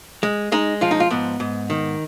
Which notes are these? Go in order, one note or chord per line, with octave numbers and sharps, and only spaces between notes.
G#3
G#3 D#4
F3 F4
D#4
F4
G#2 B3
G#2
D#3